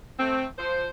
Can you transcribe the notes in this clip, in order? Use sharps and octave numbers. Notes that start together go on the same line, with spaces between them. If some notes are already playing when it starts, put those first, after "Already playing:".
A3 C4
F3 C5